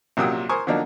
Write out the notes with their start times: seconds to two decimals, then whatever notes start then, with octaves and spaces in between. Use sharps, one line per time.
0.17 A#1 C3 F#3 G5 D#6 E6
0.49 A#4 C5 G#5 C#6 D#6
0.67 D3 F3 F#3 A#3 D4 D#4